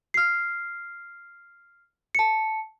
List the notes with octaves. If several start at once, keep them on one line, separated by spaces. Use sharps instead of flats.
F6 C7
A5 C#7